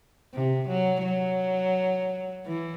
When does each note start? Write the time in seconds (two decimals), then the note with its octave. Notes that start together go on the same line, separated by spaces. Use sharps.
0.34 C3
0.68 F#3
1.04 F#3
2.46 E3